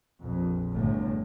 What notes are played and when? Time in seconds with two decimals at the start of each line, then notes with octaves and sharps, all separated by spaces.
0.21 A#1 F2
0.71 G1 E2 A2 D3